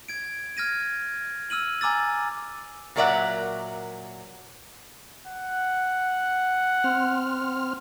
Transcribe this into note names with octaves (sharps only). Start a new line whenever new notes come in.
G#6 D7
F6 G#6 A#6 D#7
E6 F6 D#7 F#7
G#5 A#5 D6 E6 A6
A#2 F#3 A#4 D5 E5 F#5
F#5
C4 F6